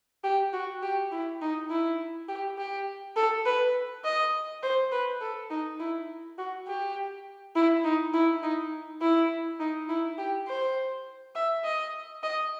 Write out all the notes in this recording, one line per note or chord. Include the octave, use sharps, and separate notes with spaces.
G4
F#4
G4
E4
D#4
E4
G4
G4
A4
B4
D#5
C5
B4
A4
D#4
E4
F#4
G4
E4
D#4
E4
D#4
E4
D#4
E4
G4
C5
E5
D#5
D#5